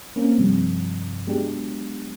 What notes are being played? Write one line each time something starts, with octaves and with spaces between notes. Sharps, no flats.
A#3 C4 C#4 A#4
G2 C3 F3
F#3 G#3 B3 D4 G4